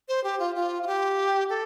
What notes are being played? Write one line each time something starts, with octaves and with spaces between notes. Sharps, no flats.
C5
G4
F4
F4
F4
G4
A4